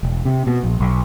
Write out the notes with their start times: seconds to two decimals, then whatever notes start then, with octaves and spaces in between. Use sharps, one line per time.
0.03 E1
0.25 C3
0.47 B2
0.63 A#1
0.80 B1